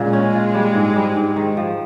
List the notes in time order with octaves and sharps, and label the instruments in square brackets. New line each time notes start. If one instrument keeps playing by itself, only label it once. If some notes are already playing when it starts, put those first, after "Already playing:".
Already playing: [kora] A#2 C#3 [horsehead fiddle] G#3
[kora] C#4
F4
G3
G#2
G3
G#2
D#3
F3